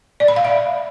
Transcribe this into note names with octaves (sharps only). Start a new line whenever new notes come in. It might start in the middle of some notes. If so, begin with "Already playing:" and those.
D5
B5
F5
E5